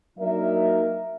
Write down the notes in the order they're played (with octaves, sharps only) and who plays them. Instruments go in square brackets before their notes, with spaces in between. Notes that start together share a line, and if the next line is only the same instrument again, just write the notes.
[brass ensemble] F#3 A#3 D4 D#4 A#4 E5